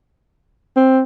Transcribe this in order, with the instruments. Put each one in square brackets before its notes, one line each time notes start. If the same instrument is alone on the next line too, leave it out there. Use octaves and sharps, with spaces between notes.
[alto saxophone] C4